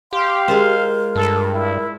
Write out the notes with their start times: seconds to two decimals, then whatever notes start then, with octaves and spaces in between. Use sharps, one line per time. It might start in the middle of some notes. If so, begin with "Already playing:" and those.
0.13 G4 F5 C6
0.48 G#3 F4 A#4 C5
1.16 G2 A4
1.53 E4